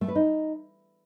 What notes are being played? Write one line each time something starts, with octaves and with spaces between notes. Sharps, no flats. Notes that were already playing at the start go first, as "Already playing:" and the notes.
A3
B4
D#4